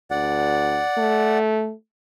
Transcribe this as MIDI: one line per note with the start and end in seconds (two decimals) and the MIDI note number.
0.11 0.80 38
0.11 1.38 74
0.11 1.38 78
0.97 1.73 57